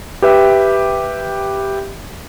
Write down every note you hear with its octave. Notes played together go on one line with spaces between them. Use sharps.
G4 B4 E5 G5